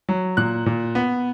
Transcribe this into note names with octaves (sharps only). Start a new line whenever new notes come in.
F#3
A#2 F#6
A#2
B3